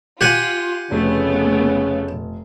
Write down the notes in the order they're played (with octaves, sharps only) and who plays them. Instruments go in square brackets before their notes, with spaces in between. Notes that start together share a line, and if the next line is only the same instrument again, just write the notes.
[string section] F4 [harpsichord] G4 F#5 G#5
[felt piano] F1 [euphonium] C#3 [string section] A3 B3